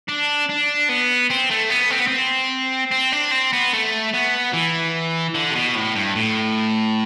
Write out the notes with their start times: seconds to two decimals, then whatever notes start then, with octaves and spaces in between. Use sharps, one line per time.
0.09 D4
0.50 D4
0.89 B3
1.30 C4
1.50 A3
1.70 B3
1.90 C4
1.99 B3
2.07 C4
2.92 C4
3.13 D4
3.32 C4
3.53 B3
3.73 A3
4.13 B3
4.53 E3
5.35 D3
5.51 C3
5.55 B2
5.75 A2
5.95 G2
6.15 A2